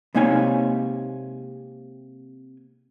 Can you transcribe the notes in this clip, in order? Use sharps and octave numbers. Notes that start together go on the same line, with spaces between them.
C3 G#3 A#3 D#4 C#5 G#5